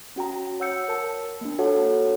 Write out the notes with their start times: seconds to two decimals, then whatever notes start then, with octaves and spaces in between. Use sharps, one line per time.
0.16 C#4 F#4 G5 A#5
0.60 C#5 F#5 E6 G6 C#7
0.88 A#4 A5
1.41 A#3 D4
1.59 F4 F#4 A4 C#5 F#5 A5